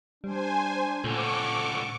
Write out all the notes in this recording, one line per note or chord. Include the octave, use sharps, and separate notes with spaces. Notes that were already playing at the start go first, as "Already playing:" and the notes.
G3 D4 C5 G#5
C#2 A#2 D3 A4 C#6 D6